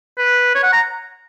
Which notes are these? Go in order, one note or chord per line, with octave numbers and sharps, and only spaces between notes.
B4
C#5
F#5
A#5